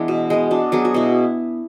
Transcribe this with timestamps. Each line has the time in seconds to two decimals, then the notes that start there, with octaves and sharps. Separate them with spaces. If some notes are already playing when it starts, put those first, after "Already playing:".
Already playing: E3 G#3 B3 D4 E4
0.08 B2
0.30 G#3 B3
0.51 B2 D4
0.72 F#3 B3 G#4
0.85 F#4
0.94 B2 E4